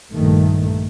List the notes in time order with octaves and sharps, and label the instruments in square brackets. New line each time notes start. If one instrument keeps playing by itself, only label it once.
[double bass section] A#1 G2 D#3 A3